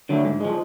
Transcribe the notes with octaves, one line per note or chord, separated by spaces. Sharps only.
D3 F#3 A3
G#2
F3 G#3